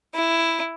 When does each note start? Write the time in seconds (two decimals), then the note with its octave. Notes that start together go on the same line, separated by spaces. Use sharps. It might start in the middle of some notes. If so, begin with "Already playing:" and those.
0.15 E4